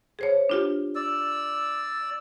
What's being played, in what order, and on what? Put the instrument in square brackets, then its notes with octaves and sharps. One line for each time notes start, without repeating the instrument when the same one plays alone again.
[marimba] G#4 C5 C#5
D4 F4 G4
[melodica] D5 E6